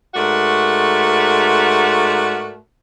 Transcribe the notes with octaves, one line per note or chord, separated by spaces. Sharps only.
G#2 A3 F#4 A#4 D5 F#5